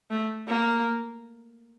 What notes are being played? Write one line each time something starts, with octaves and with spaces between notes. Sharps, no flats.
A3
A#3